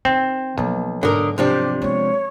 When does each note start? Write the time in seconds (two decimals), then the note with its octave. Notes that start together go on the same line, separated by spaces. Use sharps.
0.05 D#3 C4
0.58 B1 F3 A#3
1.03 G#2 D3 A#4 D#6
1.38 C3 F3 D4 G4
1.82 G#3 B3 C#5